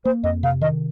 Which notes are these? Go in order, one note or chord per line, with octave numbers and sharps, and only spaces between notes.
A#3 C5
F2 D#5
C3 F5
D#3 D#5